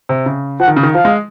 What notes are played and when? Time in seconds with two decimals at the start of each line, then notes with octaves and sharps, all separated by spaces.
0.09 C3
0.26 C#3
0.60 F3 F#5
0.68 D#3
0.76 C#3
0.83 D#3
0.94 F3 F5
1.05 G#3